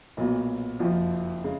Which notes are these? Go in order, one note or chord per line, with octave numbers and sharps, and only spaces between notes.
B1 A#2 F#3 B3
F#1 F2 F3
C#3 G#3